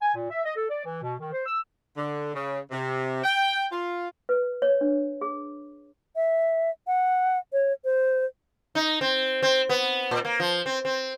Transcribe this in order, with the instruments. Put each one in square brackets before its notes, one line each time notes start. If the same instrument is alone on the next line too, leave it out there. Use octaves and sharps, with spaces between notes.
[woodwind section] G#5
A#2
E5
D#5
A4
D5
E3
B2
D#3
C5
E6
[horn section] D3
C#3
C3
G5
F4
[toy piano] B4
C#5
D4
G#4
[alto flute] E5
F#5
C#5
C5
[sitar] D#4
C4
C4
B3
A#2
A#3
F3
C4
C4